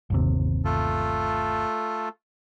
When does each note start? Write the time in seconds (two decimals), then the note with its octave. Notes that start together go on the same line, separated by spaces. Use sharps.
0.10 G1 D#2 C3
0.65 A3 F4 A4